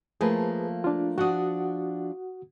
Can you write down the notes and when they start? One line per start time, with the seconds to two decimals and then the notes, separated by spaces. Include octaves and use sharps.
0.21 F3 A3 A#3 G#4 B4
0.84 D4 F4
1.18 F3 D4 F#4 F#5 D#6